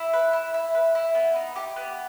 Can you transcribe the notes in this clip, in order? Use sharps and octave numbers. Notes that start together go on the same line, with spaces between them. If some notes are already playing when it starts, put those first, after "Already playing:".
Already playing: E4
B4
E4
E4
B4
E4
B3
D#4
G4
B3